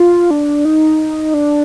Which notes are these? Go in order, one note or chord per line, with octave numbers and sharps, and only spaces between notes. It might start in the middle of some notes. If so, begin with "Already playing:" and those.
Already playing: F4
D4
D#4
D4